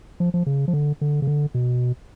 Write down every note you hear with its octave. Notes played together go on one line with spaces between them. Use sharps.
F3
F3
C#3
F3
D3
D3
C#3
D3
B2